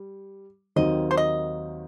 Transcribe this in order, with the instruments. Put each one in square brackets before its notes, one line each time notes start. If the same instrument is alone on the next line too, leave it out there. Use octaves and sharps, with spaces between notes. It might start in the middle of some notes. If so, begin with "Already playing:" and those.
Already playing: [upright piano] G3
[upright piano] D#2 D#3 F#3 C4 [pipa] D#5
[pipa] C5
D#5